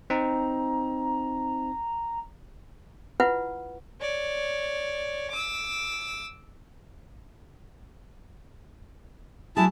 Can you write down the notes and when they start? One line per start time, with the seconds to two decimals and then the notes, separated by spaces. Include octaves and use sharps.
0.10 C4 D#4 A#5
3.20 E4 F4 B4 F#5
4.01 C#5 D5
5.30 D6 E6
9.57 F#3 A3 E4 G#4 A5